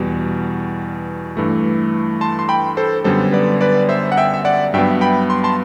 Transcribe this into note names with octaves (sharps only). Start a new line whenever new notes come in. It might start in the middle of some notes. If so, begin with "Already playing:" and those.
Already playing: E2 B2 G3
G2 E3 A3
A5 C6
C6
G5 B5
A4 C5
F#2 D3 G3 B3 A4 C5
B4 D5
B4 D5
C5 E5
F#5
E5 G5
E5
D5 F#5
G2 F#3 B3 E5 G5
G5 B5
C6
A5 C6